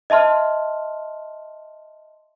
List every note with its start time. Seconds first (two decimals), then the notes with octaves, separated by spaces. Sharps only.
0.10 D#5 E5 A5 C6 F6